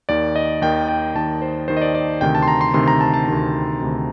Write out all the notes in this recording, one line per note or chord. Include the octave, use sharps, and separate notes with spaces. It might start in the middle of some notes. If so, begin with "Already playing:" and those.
D#2 D#3 D5
D#5
D#2 D#3 G5
G5
D#2 D#3 A5
C5
D#2 D#3 C5
D#5
D5
D5
D2 C3 D#3 G5
A5
C6
A#5
C6
D2 C3 D#3 C6
A#5
A5
A5
D2 C3 D#3
D2 C3 D#3